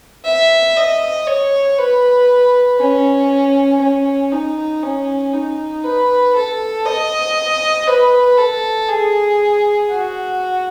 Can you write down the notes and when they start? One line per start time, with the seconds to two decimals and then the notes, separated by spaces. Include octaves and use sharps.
0.25 E5
0.76 D#5
1.27 C#5
1.78 B4
2.79 C#4
3.81 C#4
4.32 D#4
4.83 C#4
5.33 D#4
5.85 B4
6.35 A4
6.85 D#5
7.87 B4
8.37 A4
8.89 G#4
9.91 F#4